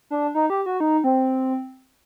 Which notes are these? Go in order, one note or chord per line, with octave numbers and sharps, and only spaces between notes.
D4
D#4
G4
F#4
D#4
C4